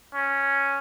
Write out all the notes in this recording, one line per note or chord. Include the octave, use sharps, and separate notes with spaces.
C#4